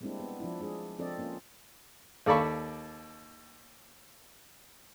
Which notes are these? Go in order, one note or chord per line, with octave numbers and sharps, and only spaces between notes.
G3 G#3 A#3 C4 D4 E4
B3
F3 D4 E4
G#3 D4 G#4
F3 C4 D4 A4 D5 D#5
A#3 C#4 F4
D#2 A4 D5 A5 B5 C#6